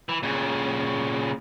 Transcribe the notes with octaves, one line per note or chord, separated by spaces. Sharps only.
E3
A#2 C#3